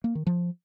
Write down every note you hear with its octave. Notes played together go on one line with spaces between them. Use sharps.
A#3
D#3
F3